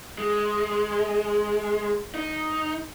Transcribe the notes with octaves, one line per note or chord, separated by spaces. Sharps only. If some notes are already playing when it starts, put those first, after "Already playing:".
G#3
D#4